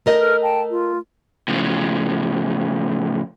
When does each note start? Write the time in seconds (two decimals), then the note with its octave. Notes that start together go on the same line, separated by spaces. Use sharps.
0.06 A3 A#4 D#5
0.20 A4 B4 F6
0.42 G5 A5
0.68 F4
1.48 A2 C#3 F3